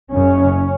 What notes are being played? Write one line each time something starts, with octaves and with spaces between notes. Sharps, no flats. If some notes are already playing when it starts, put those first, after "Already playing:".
F#1 F#2 C#3 C#4